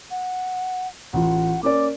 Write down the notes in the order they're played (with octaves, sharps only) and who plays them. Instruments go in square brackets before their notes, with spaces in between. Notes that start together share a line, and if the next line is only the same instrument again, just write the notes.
[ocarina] F#5
[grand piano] A1 F4 [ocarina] F#5
[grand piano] A#3 C#4 D5 [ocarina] D6